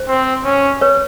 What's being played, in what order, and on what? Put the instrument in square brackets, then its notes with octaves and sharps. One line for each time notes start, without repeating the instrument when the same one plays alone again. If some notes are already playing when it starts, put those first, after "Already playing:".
Already playing: [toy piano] C5
[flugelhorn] C4
C#4
[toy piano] B4 C#5